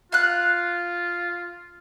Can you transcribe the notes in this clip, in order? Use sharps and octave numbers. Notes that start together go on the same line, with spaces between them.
F4 F5 F#6